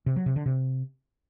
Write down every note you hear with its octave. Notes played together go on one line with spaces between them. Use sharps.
C3
F#3
C3
D3
C3